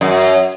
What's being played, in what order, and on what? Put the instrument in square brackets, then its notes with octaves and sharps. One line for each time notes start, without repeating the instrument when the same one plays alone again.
[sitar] F#2